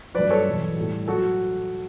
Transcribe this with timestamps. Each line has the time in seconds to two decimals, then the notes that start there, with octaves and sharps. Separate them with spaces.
0.14 G2 F#3 B4 D5
0.30 A4 C#5
0.46 E2 B2 F#3
0.77 A2 G3
1.08 F#3 F#4 A4